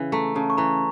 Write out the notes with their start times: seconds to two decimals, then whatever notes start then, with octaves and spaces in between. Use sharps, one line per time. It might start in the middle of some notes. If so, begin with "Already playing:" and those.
Already playing: C#3 E3
0.12 A3 A#5
0.35 C#3 A5
0.50 C#6
0.58 E3 A#5